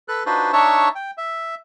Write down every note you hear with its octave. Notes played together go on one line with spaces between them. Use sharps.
A4 B4 F#6
D4 D#4 F4 F#4 B4 C5
D4 D#4 C#5 E5 A5 C#6
G5
E5